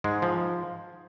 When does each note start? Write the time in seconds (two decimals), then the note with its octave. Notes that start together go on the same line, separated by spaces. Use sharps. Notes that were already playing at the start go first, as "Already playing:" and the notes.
0.04 G#2 G#3
0.22 F3